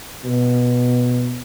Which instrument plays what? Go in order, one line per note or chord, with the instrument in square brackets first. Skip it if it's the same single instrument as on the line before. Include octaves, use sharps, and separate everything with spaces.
[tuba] B2